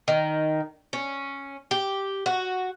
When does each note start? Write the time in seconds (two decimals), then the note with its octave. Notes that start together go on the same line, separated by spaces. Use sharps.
0.08 D#3
0.93 C#4
1.71 G4
2.26 F#4